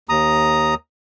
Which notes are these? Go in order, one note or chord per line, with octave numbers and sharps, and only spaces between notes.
D#2 A#5 D#6